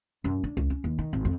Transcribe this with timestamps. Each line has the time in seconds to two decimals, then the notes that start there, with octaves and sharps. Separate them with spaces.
0.24 F#2
0.44 D4
0.57 C#2
0.70 C#4
0.84 D#2
0.98 D#3
1.13 G#1
1.25 F2